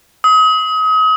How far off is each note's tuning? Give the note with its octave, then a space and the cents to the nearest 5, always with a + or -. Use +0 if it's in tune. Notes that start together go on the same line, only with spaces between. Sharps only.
D#6 +35